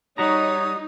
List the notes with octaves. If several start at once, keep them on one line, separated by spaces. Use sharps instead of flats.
G3 D#4 F#4 C#5 A#5 D#6